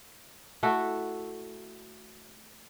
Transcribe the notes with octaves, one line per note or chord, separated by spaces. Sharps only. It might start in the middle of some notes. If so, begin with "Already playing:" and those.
A3 E4 F#4 A4